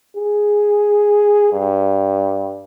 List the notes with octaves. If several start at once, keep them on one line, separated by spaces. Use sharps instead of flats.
G#4
G2